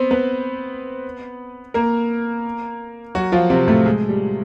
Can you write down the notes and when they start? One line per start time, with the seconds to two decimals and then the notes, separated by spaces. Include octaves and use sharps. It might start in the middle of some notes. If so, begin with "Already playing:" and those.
Already playing: B3 C4 C5
0.11 B3 B4
1.74 A#3 A#4
3.15 F#3 F#4
3.32 F3 F4
3.50 C3 C4
3.67 A2 A3
3.86 G#3
4.09 G3